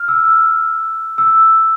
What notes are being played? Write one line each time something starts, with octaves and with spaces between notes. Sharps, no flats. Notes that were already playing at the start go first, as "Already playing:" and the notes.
Already playing: F6
E6
E6